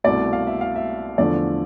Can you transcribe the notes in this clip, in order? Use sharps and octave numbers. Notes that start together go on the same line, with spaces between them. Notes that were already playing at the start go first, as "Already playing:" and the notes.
C2 B2 A3 D5
F5
E5
F5
E5
E2 D3 F3 A3 D5